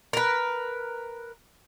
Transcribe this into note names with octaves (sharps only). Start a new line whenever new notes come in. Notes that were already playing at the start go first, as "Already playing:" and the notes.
A#4 B4